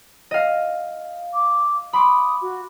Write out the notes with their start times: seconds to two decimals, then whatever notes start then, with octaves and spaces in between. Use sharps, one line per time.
0.31 D#5 F5
1.34 D6
1.93 B5 C6 D6 D#6
2.41 F#4